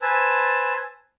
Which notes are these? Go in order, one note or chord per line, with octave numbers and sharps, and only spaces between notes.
B4 C5 G#5 A5 E6